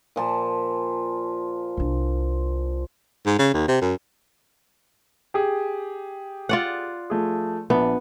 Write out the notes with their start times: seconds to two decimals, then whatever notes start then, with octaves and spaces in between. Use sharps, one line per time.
0.16 A#2 F3 A5
1.77 C2 D4
3.26 G#2
3.39 C#3
3.54 D#2
3.68 C3
3.81 F#2
5.34 G4 G#4
6.49 F4 D5 F#5
7.10 F3 A3 G#4
7.70 A#1 B3 D4 E5